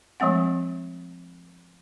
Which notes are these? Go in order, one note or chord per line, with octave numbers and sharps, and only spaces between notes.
F3 G#3 A3 C4 F#5